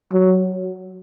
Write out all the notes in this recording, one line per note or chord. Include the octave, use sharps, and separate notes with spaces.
F#3